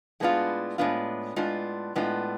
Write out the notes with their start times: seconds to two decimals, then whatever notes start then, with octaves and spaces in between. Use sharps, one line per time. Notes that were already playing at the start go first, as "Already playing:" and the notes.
0.20 A2 G#3 B3 D4 F4
0.78 A2 G#3 B3 D4 F4
1.36 A2 G#3 B3 D4 F4
1.96 A2 G#3 B3 D4 F4